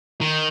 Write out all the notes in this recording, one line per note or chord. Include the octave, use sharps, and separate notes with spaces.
D#3